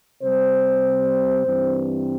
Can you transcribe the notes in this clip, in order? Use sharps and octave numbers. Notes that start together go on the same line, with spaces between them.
C3 G3 C4 C5
G2 E3 G3 C4